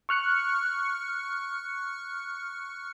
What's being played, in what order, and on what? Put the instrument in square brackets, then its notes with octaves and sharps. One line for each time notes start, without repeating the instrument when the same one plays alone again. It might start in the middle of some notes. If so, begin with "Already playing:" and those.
[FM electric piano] C#6 F6 F#6 C#7